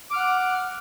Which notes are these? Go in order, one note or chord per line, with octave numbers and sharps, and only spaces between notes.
F#5 D6 F6